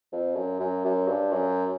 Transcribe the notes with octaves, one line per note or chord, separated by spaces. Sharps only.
F2
F#2
F#2
F#2
G2
F#2